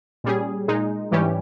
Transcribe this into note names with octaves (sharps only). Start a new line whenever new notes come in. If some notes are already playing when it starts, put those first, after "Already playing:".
A#2 G3 C#4 G#4
A#2 G#3 D#4
G#2 E3 G3 C#4 G4